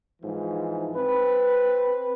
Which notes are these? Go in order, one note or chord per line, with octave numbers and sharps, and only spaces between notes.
G#2 E3 F3
C4 B4